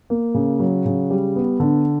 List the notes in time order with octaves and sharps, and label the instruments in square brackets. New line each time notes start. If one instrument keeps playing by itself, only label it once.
[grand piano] A#3
C#3
F#3
C#3
G3
B3
D3